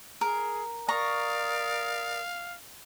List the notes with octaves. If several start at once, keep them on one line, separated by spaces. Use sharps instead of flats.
G#4 A#4
A#4 D5 F5 A#5 C#6 D#6